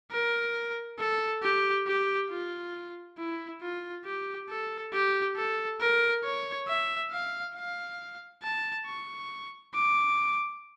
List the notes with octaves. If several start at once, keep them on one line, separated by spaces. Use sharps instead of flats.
A#4
A4
G4
G4
F4
E4
F4
G4
A4
G4
A4
A#4
C#5
E5
F5
F5
A5
C#6
D6